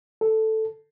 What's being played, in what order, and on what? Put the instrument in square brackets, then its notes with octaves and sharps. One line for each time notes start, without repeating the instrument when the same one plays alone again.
[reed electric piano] A4